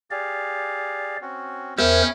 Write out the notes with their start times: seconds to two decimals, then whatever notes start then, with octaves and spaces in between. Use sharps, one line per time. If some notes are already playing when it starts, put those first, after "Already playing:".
0.11 G4 G#4 D5 F5
1.22 C4 C#4 F#4
1.78 E2 C#4 G#4 A#4 C5 E5 G5 B5